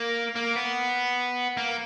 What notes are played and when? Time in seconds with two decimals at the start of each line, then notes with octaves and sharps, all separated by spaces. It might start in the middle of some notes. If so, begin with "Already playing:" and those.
Already playing: A#3
0.35 A#3
0.55 B3
1.57 A#3